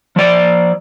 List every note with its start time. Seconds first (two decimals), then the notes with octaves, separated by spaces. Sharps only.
0.16 F3 D5